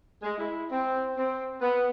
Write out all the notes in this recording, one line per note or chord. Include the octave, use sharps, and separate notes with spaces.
G#3
E4
C4
C4
B3